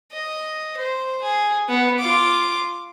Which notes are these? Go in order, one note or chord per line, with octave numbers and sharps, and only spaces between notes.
D#5
C5
G#4
B3
F4 D6